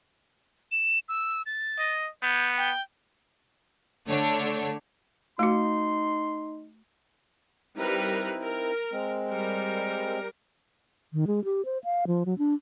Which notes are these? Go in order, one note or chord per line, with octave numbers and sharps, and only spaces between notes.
E7
E6
A6
D#5
B3 G6
G5
D3 A3 D4 C#5
A3 D#4 F#4 C6
G3 C4 D#4 E4 A#4 B4
A#4
G#3 C4
G3 A#4
D#3
G#3
G4
C5
F5
F3
F#3
D4